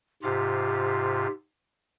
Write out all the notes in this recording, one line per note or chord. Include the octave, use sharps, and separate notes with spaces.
G#2 C3 F4 G4